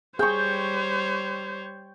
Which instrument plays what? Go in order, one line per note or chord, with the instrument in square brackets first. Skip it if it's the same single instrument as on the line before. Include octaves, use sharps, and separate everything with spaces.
[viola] G3 C#5 [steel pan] G#4 [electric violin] C5 [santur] G5 C#6